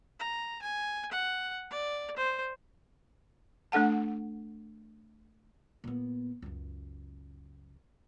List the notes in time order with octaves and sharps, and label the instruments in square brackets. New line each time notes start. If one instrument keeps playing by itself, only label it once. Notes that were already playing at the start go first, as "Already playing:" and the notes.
[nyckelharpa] A#5
G#5
F#5
D5
C5
[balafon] A3 D4 A4 F#5 A5
[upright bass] A#2 B3
C#2 F#2